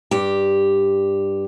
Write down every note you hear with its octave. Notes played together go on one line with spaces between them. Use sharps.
G2 G4